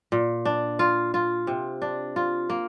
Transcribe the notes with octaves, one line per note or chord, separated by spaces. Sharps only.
A#2
D4
F4
F4
C3
D4
F4
A#3